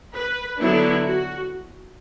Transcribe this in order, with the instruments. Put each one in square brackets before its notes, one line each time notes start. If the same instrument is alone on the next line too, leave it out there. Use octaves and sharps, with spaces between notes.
[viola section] B4
D3 F#3 B3 D4 E4
F#4